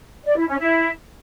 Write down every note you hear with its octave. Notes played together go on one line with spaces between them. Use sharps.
D5
E4
C#4
E4